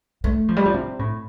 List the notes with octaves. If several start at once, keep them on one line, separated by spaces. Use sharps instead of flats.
A3
F3
G3
F3
C3
A2